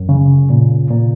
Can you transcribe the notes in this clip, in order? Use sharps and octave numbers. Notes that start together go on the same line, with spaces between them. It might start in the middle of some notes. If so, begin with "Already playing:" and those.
Already playing: F#2
C#3
A#2
A#2